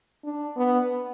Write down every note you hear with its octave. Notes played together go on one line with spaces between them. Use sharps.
D4
B3